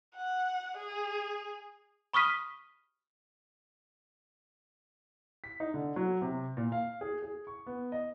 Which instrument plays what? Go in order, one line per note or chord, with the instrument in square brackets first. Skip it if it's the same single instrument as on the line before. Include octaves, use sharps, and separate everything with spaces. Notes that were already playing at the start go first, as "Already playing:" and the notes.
[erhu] F#5
G#4
[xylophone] B5 C#6 D#6 F6 B6 D#7
[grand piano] B6
D#4
D3
F#3
C3
A#2
F5
G#4
G#4
C#6
B3
D#5